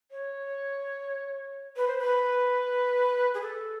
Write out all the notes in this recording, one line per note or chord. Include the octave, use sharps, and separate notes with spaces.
C#5
B4
C5
B4
G#4
A4